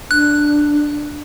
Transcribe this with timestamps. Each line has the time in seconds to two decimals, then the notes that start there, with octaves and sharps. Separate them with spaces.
0.11 D4 F#6